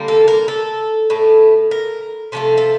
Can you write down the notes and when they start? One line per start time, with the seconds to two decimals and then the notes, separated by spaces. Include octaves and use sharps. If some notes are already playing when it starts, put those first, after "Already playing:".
Already playing: D3 G3 A#3
0.08 A4
0.28 A#4
0.48 A4
1.10 A2 A3
1.71 A#4
2.32 C3 F3 A3 A4
2.57 A4